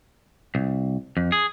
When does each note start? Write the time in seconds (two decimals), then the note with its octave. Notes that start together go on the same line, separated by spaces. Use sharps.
0.55 C2
1.17 F2
1.32 G#4